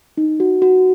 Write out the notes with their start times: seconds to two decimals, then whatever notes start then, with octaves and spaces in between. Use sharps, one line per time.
0.17 D#4
0.40 F#4
0.62 F#4